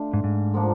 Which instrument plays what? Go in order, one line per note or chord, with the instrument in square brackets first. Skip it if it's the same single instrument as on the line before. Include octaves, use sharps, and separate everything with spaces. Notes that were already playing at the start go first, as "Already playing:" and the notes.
Already playing: [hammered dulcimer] A3 D4 F4
[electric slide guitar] G#2
G#2
[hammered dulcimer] D3 F3 A#3 D4